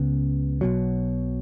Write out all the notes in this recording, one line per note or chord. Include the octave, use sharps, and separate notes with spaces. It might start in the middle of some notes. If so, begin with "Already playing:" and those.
Already playing: C#2 C#3 B3
B1 B2 F#3